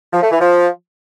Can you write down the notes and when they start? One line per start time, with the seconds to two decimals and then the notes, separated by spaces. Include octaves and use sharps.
0.13 F3
0.22 A3
0.31 E3
0.40 F3